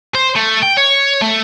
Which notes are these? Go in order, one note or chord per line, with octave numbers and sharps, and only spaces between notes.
C5
A3
G5
C#5
A3